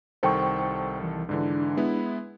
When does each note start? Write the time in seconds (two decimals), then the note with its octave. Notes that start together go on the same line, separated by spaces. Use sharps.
0.23 C2 D#3 A4 C5 G5 C#6
1.03 E3
1.29 G#2 D3 E3 D4
1.77 G#3 B3 E4